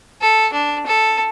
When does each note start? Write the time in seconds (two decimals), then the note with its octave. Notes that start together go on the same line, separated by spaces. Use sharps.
0.22 A4
0.53 D4
0.87 A4